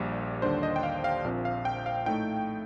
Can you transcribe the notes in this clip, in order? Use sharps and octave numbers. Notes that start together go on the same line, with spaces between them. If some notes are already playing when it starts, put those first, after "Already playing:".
Already playing: A#1 A#2 G3
D#2 D3 G3 D4 C5
D#5
G5
F5
F5
A#1 A#2 F3 C4
F5
G5
F5
A2 A3 D#4 G5